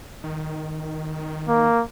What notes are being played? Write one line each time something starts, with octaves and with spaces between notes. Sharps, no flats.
D#3
A#3